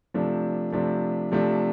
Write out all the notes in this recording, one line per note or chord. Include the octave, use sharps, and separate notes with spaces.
C3 F3 A3 D4
C3 F3 A3 D4
C3 F3 A3 D4